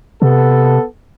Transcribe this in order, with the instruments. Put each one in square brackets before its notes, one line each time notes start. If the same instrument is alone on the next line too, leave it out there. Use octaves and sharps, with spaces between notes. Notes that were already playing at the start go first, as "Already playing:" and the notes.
[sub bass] C3 [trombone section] B3 A4